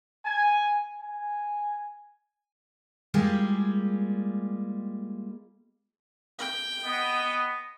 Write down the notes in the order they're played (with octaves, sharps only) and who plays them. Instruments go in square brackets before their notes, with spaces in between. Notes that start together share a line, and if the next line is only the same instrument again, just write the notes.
[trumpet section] G#5
G#5
[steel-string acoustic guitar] G3 G#3 A#3 F4 G4 G#4
[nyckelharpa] G5
[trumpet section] B3 D#5